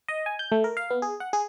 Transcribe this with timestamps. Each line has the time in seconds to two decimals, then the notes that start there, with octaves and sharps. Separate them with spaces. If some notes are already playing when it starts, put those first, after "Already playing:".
0.08 D#5
0.26 G#5
0.39 G6
0.52 A3
0.64 A#4
0.77 F5
0.90 B3
1.02 G#4
1.20 F#5
1.33 G#4